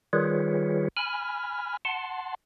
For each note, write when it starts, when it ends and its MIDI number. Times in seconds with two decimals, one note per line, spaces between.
0.13 0.88 51
0.13 0.88 55
0.13 0.88 65
0.13 0.88 68
0.13 0.88 71
0.13 0.88 73
0.97 1.77 80
0.97 1.77 83
0.97 1.77 89
1.85 2.35 78
1.85 2.35 81
1.85 2.35 84